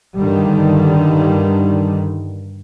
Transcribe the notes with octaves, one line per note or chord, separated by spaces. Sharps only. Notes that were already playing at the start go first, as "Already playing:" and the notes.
G2 D3 D#3 G3